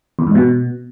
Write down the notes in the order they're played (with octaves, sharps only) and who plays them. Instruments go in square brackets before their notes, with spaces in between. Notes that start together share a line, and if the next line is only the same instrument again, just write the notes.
[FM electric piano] E2
G#2
B2